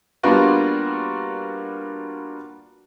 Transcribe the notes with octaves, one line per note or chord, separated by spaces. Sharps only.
G3 A#3 B3 D4 F4 F#4